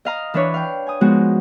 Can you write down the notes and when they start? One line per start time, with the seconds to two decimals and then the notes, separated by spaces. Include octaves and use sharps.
0.05 D#5 F5 A#5
0.34 E3 D4 B4 C#5
0.54 F5 G5
0.87 G#5 D#6
1.01 F3 G#3 B3 D#4 F#4